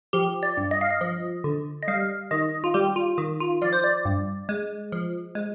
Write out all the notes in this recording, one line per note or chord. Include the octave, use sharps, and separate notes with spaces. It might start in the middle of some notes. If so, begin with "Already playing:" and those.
F3 G4
D5
G2
D#5
F5
D#5
F3
D3
D#5
G3 F5
D#3 D#5
F4
G3 G4
F4
D#3
F4
F3 D5
C5
D5
G2
G#3
F3
G#3